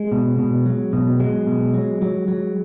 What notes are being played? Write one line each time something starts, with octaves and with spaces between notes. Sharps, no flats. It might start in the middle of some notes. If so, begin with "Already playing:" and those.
Already playing: G#3
B2
B2
F#3
B2
F#3 G#3
B2
F#3
F#3
F#3